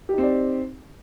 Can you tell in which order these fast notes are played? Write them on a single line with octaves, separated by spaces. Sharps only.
G4 D#4 C4 D5